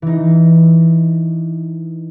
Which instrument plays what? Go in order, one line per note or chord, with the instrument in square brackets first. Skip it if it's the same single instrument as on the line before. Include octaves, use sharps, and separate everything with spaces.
[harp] E3 D#4